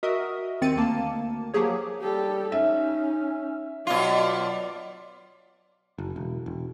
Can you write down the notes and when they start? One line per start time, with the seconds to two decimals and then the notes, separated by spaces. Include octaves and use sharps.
0.03 F#4 A#4 D#5 E5 D#6
0.61 D#2 D#3 C4 A6 C#7 D#7
0.76 D2 A#3 A5
1.54 F3 F#3 A#3 G4 G#4 C#5
2.01 G3 G4 A4
2.52 C#4 D#4 E5
3.87 B2 F#3 F4 D5
5.98 F#1
6.16 E1
6.46 E1